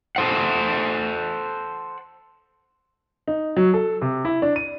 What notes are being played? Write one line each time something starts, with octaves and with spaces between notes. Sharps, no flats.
A4 C5 F#5
D#4
F#3
A4
C3
E4
D4
D#7